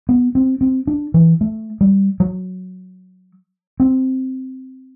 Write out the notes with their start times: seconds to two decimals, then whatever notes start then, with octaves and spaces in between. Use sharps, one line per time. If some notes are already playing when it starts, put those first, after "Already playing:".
0.09 B3
0.35 C4
0.61 C4
0.87 D4
1.14 E3
1.41 A3
1.81 G3
2.20 F#3
3.80 C4